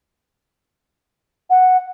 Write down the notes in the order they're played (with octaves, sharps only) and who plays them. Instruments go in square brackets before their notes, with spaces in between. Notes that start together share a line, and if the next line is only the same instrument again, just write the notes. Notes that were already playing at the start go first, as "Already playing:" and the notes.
[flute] F#5